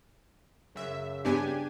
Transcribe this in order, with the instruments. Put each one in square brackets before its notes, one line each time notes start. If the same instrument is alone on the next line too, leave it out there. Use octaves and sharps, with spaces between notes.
[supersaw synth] F#2 E5 [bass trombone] C#3
[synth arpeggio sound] G2 B3 [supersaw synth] D4 G4 G#5